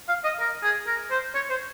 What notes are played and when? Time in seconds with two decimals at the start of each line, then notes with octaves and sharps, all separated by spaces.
0.08 F5
0.24 D#5
0.40 A#4
0.63 G#4
0.87 A#4
1.11 C5
1.35 C#5
1.50 C5